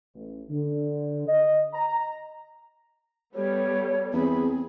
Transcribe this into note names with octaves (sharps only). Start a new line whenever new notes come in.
A1
D3
D#5
A#5
G3 B3 A4 C#5
E2 C4 G#4 B5